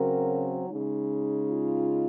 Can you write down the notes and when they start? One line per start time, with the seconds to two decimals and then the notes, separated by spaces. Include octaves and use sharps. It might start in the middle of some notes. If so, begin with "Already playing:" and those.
Already playing: C#3 F#3 C4 F#4 A#4
0.68 C#3 G#3 D#4
1.50 F4